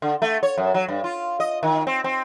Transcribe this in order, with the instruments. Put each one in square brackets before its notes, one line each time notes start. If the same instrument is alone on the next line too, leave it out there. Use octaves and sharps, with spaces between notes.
[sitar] D3
A3
C#5
F#2
F#3
G2
F4
D#5
D#3
C4
C4